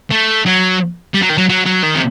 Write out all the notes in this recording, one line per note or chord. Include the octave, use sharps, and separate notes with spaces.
A3
F#3
G3
F#3
D#3
F#3
F#3
F#3
D#3
C3